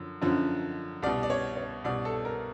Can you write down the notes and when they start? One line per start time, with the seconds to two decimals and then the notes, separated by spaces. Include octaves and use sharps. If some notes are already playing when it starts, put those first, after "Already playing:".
Already playing: F#2 D3 F3
0.22 F#2 D3 F3
1.02 C2 B2 D5
1.23 D5
1.30 C#5
1.57 C#5
1.84 C2 B2 D5
2.05 A4
2.25 A#4